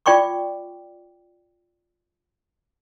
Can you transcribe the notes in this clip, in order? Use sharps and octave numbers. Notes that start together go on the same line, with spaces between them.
F4 D5 G5 C#6 D6